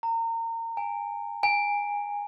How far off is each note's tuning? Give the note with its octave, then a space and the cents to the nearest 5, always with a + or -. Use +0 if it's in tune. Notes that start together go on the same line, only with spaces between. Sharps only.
A#5 -30
G#5 -25
G#5 -15